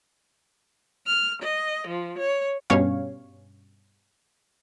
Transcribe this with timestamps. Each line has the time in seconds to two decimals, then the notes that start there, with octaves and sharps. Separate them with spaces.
1.06 F6
1.41 D#5
1.86 F3
2.18 C#5
2.70 G2 B2 G3 C#4 C#5 F5